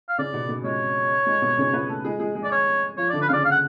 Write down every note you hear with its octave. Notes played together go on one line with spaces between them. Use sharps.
F5
C#3 C#4 D5
B2 B3
B2 B3
G#3 C#5
G#3
B2 B3
C#3 C#4
B3 B4
A3 A4
G#3 G#4
G#3 G#4
G#3 G#4
D5
C#5
F3 F4 C#5
D5
D3 D4
B4
C#3 C#4 D5 F5
F5
F#5